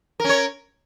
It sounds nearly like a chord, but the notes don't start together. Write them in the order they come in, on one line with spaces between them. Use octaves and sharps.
A#4 C#4 C#5